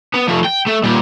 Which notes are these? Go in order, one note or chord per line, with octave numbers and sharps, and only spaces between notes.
B3
F3 A3
G5
A3
A#2 G3